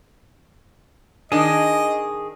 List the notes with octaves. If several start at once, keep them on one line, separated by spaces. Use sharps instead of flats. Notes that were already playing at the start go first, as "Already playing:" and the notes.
D#3 D4 G#4 D#5